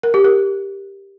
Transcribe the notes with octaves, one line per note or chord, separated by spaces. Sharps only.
A#4
G4
A#4